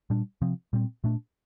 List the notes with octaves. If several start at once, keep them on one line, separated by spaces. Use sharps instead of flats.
A#2 G3 D4
C3 F3 C4
A#2 G3 C4
A#2 A3 D4